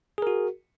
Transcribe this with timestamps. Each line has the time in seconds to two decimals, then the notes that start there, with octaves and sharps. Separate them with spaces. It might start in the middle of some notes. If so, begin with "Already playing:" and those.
0.18 G#4
0.22 A#4
0.27 F#4